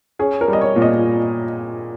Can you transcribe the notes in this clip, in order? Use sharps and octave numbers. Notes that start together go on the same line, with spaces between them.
C#4 G#4
A#4
G3
D#5
C#5
A#2
D#5